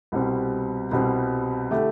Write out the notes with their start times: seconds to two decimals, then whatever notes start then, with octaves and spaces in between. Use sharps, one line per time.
0.12 C2 B2 G3 C4
0.91 C2 B2 G3 C4
1.71 D3 A3 E4 G4